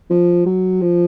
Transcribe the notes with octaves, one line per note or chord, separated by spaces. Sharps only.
F3
F#3
F3